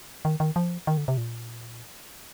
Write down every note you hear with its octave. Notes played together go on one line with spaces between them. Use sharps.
D#3
D#3
F3
D#3
D3
C3
A#2